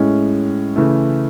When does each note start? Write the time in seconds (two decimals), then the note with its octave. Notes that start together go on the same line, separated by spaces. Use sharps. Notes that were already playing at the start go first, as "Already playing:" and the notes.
Already playing: A2 G#3 C#4
0.76 C#3 E3 A3